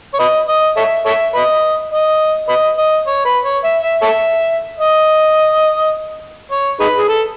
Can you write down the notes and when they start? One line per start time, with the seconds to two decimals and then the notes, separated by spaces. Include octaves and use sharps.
0.14 C#5
0.19 B4 D#5
0.48 D#5
0.77 A4 C#5 E5
1.05 A4 C#5 E5
1.34 B4 D#5
1.92 D#5
2.49 B4 D#5
2.78 D#5
3.07 C#5
3.25 B4
3.45 C#5
3.64 E5
3.83 E5
4.02 A4 C#5 E5
4.79 D#5
6.51 C#5
6.80 D#4 G#4 B4
6.97 G#4
7.09 A4